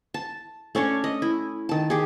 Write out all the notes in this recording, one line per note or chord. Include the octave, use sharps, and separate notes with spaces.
A5
A3 C#4 D4 C#5
D#5
E4
D#3 A5
G4 G#4